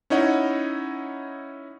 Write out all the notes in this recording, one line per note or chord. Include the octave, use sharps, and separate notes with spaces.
C#4 D#4 E4 C#5 D#5 F#5